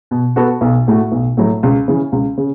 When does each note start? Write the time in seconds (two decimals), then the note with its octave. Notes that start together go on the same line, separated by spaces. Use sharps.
0.11 B2
0.36 B3 F#4 A4
0.61 B1
0.88 A2 A3 F#4
1.12 B1
1.37 A2 F#3 A3
1.63 C#2
1.88 C#3 E3
2.12 C#2
2.37 C#3